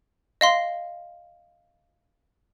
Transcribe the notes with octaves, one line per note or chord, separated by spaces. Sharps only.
D#5 F5 C6